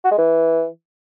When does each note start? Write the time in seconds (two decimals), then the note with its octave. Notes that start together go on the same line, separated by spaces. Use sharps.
0.04 F#4
0.11 G#3
0.18 E3